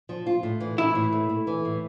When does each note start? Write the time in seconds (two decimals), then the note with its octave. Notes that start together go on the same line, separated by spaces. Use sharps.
0.09 F3
0.27 F4
0.43 A2
0.60 E3
0.78 E3 E4
0.95 A2
1.13 A3
1.29 A3
1.47 E3
1.65 A2